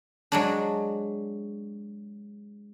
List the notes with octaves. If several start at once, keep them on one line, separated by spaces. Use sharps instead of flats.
F#3 G#3 D4